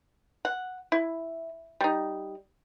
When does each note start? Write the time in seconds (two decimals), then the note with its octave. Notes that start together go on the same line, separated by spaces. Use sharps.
0.45 F#5
0.92 E4
1.81 G3 D#4